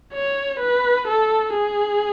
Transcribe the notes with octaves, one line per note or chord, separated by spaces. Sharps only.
C#5
B4
A4
G#4